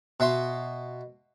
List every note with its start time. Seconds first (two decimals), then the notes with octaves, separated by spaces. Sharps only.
0.20 B2 E5 C6